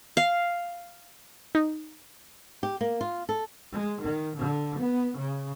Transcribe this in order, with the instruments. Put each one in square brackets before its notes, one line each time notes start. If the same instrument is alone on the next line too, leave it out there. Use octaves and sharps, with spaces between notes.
[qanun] F5
[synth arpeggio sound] D#4
[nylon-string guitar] G4
A#3
F4
A4
[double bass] G#3
D#3
D3
B3
C#3